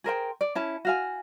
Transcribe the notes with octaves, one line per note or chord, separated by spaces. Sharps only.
G#4 A#4 C5 G5
D5
C#4 E4 A5
F#4 F5 G#5